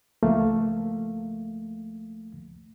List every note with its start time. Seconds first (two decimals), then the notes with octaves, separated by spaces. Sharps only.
0.23 C#2 F3 A3 A#3 F5